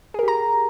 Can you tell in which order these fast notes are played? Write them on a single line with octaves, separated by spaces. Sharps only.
G#4 A#4 G4 A#5